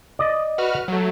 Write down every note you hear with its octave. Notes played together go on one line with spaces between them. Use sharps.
D5 D#5
F#4 B4 F6
F#3 A3